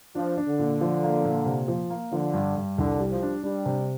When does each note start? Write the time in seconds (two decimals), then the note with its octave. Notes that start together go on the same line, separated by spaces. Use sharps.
0.15 F3 D4
0.37 D4
0.48 D3
0.59 A#2
0.81 F3
1.03 A#3
1.24 A#2
1.46 C3
1.68 F3
1.90 A#3
2.12 D3 F3
2.34 G2
2.56 G2
2.78 C2 D3
2.99 G3
3.11 F3
3.22 D4
3.43 G3 D4
3.66 C3